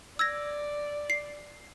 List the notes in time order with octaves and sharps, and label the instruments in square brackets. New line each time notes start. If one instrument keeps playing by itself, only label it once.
[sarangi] D5 [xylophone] E6 G#6 A#6
[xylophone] C7